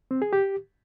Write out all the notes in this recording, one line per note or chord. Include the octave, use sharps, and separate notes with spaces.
C4
G#4
G4